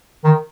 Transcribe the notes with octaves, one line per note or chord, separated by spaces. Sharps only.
D#3